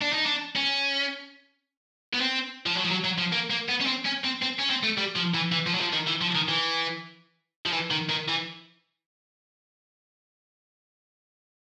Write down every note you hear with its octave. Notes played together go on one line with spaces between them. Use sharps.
D4
D#4
D4
C#4
B3
C4
F3
F#3
F3
F#3
F#3
F3
A#3
A#3
B3
C#4
C4
C#4
C4
C4
C#4
C4
A3
G3
F3
E3
E3
F3
F#3
F3
D#3
E3
F3
D#3
E3
F3
E3
D#3
D#3
E3